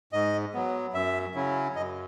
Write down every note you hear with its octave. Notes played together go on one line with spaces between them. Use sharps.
G#2 D#5
F#3 B3
F#2 E5
C#3 F#3 C#4 E4
F#2 D#5